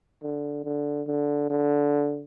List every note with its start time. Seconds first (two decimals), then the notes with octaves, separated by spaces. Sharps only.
0.23 D3
0.64 D3
1.07 D3
1.50 D3